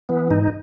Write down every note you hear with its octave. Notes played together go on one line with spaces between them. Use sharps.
E3 B3
G#2 D#4